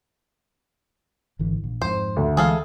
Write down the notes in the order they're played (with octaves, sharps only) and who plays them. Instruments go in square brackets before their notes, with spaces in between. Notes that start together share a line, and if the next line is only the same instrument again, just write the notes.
[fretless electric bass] G#1 D3 E3
A#1
[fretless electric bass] F2 G#2 [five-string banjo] C5
[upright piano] D2
[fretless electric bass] E3 G#3 [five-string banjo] G#4 A4 F5